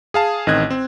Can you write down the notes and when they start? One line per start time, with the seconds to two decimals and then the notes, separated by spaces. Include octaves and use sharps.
0.14 G#4 F5 A5
0.47 A1 D#3 C4 D#5 F#6 G#6
0.70 C4